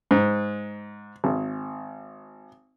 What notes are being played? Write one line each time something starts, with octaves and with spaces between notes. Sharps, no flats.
G#2
G#1